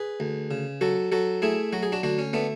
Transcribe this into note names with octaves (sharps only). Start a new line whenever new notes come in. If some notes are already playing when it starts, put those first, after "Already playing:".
Already playing: G#4 B4
D2
C#3
F#3 F#4 A4
F#3 F#4 A4
A3 E4 G#4
F#3 F#4
G#4
D4 F#4
D2 D4 F#4
C#4
A3 B3 D4